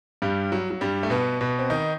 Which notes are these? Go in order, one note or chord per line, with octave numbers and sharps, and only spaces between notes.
G2 G3
F#3
F#3
G2 G3
A3
B2 B3
B2 B3
C4
D#3 D#4